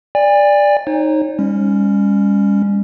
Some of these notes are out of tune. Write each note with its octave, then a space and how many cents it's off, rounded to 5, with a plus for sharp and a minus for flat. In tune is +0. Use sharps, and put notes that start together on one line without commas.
D5 +0 G#5 -40
D#4 +0 C#5 -40
G3 +45 C#4 +0